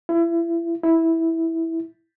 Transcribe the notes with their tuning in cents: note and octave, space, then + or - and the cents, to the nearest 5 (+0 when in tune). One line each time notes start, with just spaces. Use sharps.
E4 +30
E4 -10